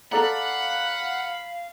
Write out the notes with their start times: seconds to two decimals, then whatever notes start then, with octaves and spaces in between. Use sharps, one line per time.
0.12 A4 D5 F5 F#5 A#5 B5